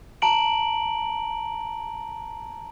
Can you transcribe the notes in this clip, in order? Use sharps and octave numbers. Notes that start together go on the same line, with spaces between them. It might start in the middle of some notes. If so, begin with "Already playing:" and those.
A5 A#5 D7 F#7